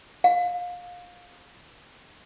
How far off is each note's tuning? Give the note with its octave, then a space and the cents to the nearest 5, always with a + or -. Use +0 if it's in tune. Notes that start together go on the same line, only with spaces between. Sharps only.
F5 +25